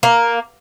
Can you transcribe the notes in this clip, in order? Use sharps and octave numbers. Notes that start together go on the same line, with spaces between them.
A#3